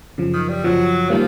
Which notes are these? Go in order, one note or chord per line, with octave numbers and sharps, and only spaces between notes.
F#2 C#3 F3
D#3
G3
F#2 C#3 F3 F#3
D#3 F3 G3 A#3